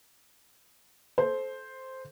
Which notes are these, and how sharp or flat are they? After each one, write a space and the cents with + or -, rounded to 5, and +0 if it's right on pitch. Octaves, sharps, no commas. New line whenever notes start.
A4 -25 C5 +0